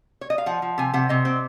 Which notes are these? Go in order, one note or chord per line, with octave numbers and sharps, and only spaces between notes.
C#5
D#5
F5
F3 F#5
F3
C3 G#5
C3 F#5
C3 D#5
C4